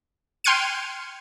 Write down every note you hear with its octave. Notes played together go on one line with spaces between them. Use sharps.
G5 C6 F6 G#6 C#7 D#7